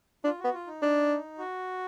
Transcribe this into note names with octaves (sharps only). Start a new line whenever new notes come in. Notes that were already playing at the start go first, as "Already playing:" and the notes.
D4 F4
B3 F#4
F4
D#4
D4
F#4